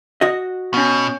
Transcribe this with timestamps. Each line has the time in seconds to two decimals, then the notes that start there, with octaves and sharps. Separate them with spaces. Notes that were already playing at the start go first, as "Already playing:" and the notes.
0.21 F#4 D#5
0.74 B2 B3 C#4